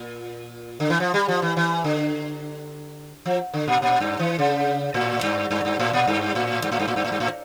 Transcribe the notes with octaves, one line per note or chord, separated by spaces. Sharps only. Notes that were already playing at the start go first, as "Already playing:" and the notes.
Already playing: A#2
D3
E3
F3
G3
F3
E3
E3
D3
F3
D3
A#2
A#2
G2
E3
C#3
A2
G2
G2
G2
A2
A#2
G2
A2
G2
A2
G2
A2
G2
A2
G2
A2